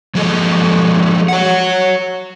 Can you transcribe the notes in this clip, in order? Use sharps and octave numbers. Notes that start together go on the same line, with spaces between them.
F3 G#3 G#4 A4 D#5
C#5 F#5